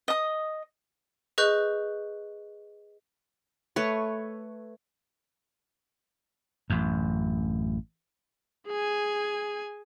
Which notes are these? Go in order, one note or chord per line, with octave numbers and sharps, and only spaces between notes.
D#5 D#6
G#4 B4 D#5 C#6 F#6 G6
A3 B4 C#5
A1 F#2
G#4 G#5